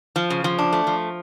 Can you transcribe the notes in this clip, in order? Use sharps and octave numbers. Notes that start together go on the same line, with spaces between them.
F3
C#3
F3
D4
A3
F3